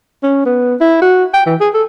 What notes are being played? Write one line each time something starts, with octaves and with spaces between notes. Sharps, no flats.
C#4
B3
E4
F#4
G5
E3
G#4
A4